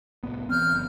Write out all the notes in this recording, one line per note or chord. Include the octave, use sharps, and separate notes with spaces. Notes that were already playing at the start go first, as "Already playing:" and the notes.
C2 A2 B3
E3 B3 C4 F6 G6
F#1